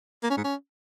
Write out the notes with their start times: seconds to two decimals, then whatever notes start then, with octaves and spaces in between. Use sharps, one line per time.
0.23 A#3
0.30 C#4
0.37 G#2
0.44 C#4